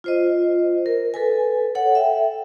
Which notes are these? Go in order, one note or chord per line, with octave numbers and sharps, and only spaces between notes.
F4 C5 D#5
A#4
A4 B4 G#5
A4 C#5 F#5
E5 G5